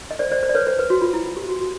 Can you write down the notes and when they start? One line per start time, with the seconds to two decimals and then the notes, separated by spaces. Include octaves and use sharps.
0.11 D#5
0.19 C5 D5
0.32 C5 D5
0.43 C5
0.49 D5
0.55 B4 C#5
0.67 C5
0.79 B4
0.90 F#4
1.02 F4
1.14 E4
1.25 F4
1.37 G4
1.49 F#4
1.60 F#4